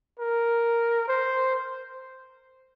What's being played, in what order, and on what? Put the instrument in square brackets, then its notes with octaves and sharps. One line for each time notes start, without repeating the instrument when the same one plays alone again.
[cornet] A#4
C5